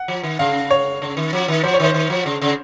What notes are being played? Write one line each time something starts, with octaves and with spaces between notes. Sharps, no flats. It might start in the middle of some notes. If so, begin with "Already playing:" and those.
Already playing: F#5
F3
D#3
C#3 F5
C#5
C#3
D#3
F3
D#3
F3 C5
C#5
D#3 C5
D#3
F3
C#3
C#3